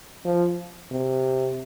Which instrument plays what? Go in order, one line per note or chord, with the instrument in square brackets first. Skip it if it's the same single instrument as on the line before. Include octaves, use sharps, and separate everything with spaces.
[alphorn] F3
C3